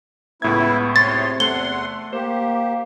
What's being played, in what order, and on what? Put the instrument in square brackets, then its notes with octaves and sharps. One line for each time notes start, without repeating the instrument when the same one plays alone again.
[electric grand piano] C#2 A2 G#6 [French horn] B3 [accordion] E4
[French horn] C3 [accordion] C#5 C6 [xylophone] A6
[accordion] E2 F#5 C6 [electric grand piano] A3 [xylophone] G7
[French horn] A#3 [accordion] G4 [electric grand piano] C5